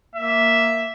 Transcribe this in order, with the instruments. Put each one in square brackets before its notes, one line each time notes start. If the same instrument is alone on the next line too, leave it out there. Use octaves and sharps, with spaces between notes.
[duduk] A#3 [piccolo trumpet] E5